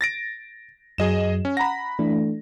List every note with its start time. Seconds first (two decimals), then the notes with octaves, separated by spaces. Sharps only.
0.01 A6 A#6 D7
0.98 F#2 F#3 G#4 D#5 E7
1.45 C#4
1.57 F#5 A#5 B5 A#6
1.99 E3 A3 D4